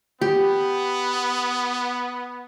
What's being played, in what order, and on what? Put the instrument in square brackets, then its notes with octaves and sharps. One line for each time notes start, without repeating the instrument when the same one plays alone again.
[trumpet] B3 [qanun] G4